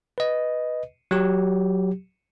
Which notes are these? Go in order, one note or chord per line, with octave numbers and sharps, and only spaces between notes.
B4 D#5
F#3 G4